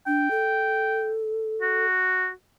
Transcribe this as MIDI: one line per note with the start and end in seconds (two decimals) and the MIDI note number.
0.07 0.28 62
0.07 1.10 79
0.31 1.86 69
1.62 2.30 66